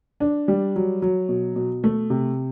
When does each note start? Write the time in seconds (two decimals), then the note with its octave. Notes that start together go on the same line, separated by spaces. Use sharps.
0.20 D4
0.48 G3
0.76 F#3
1.02 F#3
1.29 B2
1.56 B2
1.84 A3
2.10 C3